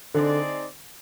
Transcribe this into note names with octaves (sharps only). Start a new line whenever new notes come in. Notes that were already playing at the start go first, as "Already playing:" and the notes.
D3 C4 D#4 G#4 D5